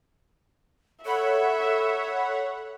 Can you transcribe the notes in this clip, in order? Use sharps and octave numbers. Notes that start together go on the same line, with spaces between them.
A4 C#5 E5 F#5 B5